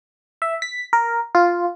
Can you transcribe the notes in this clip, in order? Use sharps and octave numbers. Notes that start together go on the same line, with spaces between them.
E5
B6
A#4
F4